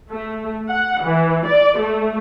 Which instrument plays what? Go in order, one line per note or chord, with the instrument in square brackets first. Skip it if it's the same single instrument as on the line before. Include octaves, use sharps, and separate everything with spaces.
[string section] A3
F#5
E3
D5
A3